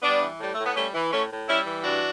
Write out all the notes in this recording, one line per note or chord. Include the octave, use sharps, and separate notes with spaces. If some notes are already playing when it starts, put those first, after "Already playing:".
G3 B3 D4
E3
A2 G3
A2 A3
B3
G3 A3 C#4
E3
A2 A3 C#4
A2
G3 C#4 E4
E3
G2 D4 F#4